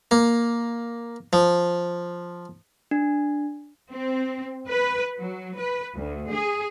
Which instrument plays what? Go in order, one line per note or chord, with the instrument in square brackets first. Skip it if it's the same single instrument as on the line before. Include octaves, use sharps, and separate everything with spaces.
[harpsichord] A#3
F3
[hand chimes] D4
[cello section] C4
B4
F#3
B4
D2
G#4